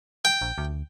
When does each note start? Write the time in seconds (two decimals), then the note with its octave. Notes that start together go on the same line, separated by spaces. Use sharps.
0.25 G5
0.41 A#1
0.58 D2